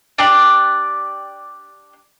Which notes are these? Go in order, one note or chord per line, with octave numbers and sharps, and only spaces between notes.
D4 G4 D5